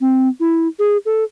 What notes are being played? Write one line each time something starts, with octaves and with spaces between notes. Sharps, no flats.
C4
E4
G#4
A4